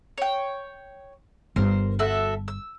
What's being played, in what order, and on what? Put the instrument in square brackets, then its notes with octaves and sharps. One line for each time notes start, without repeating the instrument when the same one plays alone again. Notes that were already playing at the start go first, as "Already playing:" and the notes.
[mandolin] C#5 G5
[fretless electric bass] G1 G2 [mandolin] A#4 C5
[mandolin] F#4 A4 E5
E6